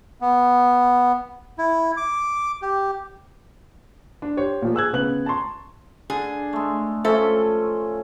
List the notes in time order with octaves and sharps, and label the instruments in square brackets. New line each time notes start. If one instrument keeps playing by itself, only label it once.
[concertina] B3
E4
D6
G4
[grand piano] D4
G4 C5 C#5
A#2 F3
G#4 E6 F#6 G#6
C#3 B3 F#6 F#7
A5 A#5 C6 C#6
[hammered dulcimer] D3 [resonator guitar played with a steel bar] G#4
[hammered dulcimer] G#3 A3
[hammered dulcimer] F3 A3 C#4 [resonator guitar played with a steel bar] A4 E5